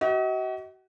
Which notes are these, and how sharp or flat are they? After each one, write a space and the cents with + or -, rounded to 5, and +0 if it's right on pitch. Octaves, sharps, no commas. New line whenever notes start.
F#4 +35 D#5 +40